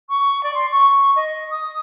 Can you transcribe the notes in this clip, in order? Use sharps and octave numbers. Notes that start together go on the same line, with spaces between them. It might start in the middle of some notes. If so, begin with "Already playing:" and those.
C#6
D5
C6
C#6
D#5
D#6